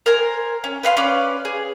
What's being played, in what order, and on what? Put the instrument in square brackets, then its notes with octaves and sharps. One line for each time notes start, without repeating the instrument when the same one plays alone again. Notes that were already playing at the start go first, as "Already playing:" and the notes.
[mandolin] A#4 C5 G#5
C#4
B4 E5 F5 C6
C#4 B4 D5
G#4